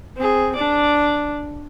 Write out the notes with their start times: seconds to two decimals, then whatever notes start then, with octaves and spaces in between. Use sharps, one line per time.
0.17 C4 G#4
0.56 D4 D5